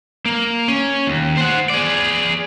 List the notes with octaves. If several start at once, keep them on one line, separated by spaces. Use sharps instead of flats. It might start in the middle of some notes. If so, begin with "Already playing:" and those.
A#3
C#4
D#2
C5 F#5
G#4 D5